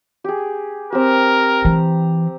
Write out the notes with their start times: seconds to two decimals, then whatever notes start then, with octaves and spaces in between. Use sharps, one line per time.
0.24 G4 G#4
0.92 C4 G4 A#4
1.65 E3 A#5